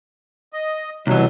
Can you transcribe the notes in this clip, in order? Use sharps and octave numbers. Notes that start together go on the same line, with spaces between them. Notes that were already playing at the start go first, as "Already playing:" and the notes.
D#5
C2 G2 B2 E3 F#3